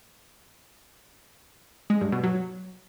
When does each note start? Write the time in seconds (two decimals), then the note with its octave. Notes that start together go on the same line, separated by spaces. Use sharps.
1.90 G#3
2.01 G2
2.12 B2
2.23 F#3